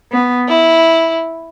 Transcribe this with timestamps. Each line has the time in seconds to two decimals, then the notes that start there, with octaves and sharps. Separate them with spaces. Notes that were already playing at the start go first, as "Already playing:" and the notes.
0.11 B3
0.49 E4